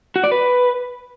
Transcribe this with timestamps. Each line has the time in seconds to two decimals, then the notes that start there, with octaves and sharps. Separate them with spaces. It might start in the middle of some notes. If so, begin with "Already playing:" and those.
0.16 F#4
0.24 D5
0.32 B4